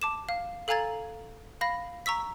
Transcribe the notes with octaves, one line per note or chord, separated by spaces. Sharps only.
A5 D6 E7
F5
A4 F5 G#5 A#5 G#6 A6
F5 B5 A#6
A#5 C#6 E6 B6